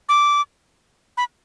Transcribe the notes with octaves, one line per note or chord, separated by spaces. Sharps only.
D6
B5